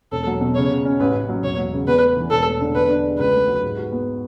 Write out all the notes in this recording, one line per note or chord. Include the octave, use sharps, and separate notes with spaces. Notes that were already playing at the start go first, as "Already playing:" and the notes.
E1 A4
F#3
B2
C#3 C#5
C#3
C#4
A1 B4
A1
F#3
E1 C#5
F#3
C#3
E2 B4
A3
E3
E1 A4
A3
D3
E2 B4
D4
G#3
C#2 B4
A3
F#3
G#2
F#4
B3